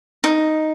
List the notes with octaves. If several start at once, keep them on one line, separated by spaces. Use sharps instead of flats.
D#4